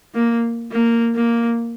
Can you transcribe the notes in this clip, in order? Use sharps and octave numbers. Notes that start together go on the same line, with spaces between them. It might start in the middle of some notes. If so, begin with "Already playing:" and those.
A#3
A#3
A#3